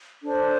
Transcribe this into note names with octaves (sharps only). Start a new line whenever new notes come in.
D4 A4 C5